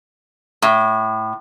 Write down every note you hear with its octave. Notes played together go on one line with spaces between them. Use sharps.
A2